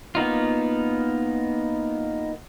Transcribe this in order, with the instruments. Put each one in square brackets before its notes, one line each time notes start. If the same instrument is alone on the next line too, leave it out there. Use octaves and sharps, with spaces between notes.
[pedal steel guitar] A#3 B3 D#4 F4